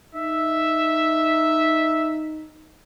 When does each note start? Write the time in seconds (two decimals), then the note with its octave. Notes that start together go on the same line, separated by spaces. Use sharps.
0.15 D#4 E5